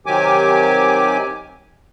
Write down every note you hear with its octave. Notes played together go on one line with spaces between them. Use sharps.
C3 D#3 F#3 G4 G#5 D6